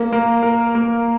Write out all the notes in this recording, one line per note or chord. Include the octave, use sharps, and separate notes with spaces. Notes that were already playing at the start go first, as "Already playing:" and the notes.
Already playing: A#3
A#3
A#4
A#3